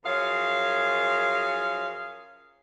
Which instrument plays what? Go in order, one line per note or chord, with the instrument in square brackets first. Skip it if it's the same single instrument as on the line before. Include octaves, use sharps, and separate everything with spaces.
[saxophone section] F#2 F3 G#4 C#5 F5